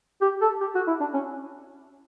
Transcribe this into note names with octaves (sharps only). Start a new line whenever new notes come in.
G4
A4
G4
F#4
E4
D4
C#4